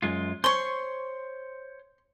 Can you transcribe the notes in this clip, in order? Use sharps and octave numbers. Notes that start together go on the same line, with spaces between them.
F#2 G#3 F4
C5 C#5 C6 C#6